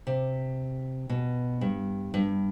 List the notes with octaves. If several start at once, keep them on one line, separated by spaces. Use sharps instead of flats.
C3
B2
G2
G2